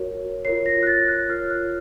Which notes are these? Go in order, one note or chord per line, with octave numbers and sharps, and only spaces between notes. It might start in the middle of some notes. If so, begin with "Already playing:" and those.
Already playing: F#4 A#4 C#5
F4 A#4 C#5 C7
A#6
F#6
A6
F#6
F4 A#4 C#5 F6
F#6